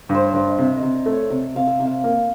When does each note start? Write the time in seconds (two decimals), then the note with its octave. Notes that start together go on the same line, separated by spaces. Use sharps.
0.09 G2
0.14 C5
0.24 C#5
0.34 G2 D5
0.47 D#5
0.58 C3 E5
0.76 D#5
0.82 C3
0.95 D5
1.06 A3
1.13 C#5
1.30 C3 D5
1.55 C3 F5
1.67 E5
1.80 C3
1.85 F5
2.04 A#3